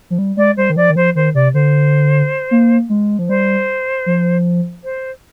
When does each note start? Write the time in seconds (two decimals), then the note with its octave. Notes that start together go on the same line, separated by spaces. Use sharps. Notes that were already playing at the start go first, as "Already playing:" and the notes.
0.10 F3
0.18 G3
0.37 G#3 D5
0.57 G3 C5
0.70 D#3
0.76 F3 D5
0.90 D#3
0.96 F3 C5
1.15 D#3 C5
1.35 C3 D5
1.54 D3 C5
2.51 A#3
2.89 G#3
3.19 F3
3.28 G3 C5
4.06 F3
4.83 C5